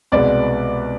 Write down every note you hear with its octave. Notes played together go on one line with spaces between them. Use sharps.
C2 B2 G#3 B3 D5